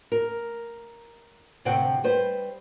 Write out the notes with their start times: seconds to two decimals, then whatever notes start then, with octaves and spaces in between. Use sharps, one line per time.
0.12 A#4
1.65 D2 A2 C3 C4 F#5 G5
2.04 G3 B4 C5